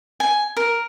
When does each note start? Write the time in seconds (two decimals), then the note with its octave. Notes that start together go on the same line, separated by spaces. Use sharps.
0.20 G#5
0.57 A#4